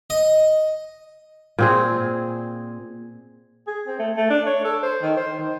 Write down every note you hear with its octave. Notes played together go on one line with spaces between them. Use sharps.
D#5
A#2 C4 G#4
G#4
C4
A3
A3
D4
C#5
A4
C5
D#3
C5
D#3